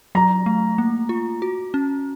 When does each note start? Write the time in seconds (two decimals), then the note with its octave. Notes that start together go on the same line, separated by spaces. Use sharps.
0.15 F#3 A#5
0.46 A3
0.78 A#3
1.09 F4
1.42 F#4
1.74 C#4